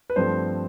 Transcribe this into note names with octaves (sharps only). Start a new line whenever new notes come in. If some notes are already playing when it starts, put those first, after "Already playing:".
B4
G2 F3 A3 C4 C5